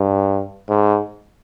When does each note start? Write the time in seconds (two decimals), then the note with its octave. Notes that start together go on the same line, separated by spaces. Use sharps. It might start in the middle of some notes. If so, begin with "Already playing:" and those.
Already playing: G2
0.69 G#2